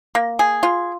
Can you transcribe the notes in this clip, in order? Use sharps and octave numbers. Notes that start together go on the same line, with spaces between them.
A#3
G#4
F4